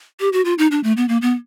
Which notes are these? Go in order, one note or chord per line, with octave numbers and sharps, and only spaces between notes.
G4
F#4
F4
D#4
D4
A3
B3
A#3
B3